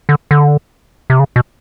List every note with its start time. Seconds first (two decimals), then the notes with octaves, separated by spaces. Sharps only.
0.09 D3
0.31 D3
1.10 C3
1.19 C#3
1.36 B2